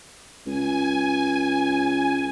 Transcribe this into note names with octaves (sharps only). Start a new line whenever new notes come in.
C#2 G#5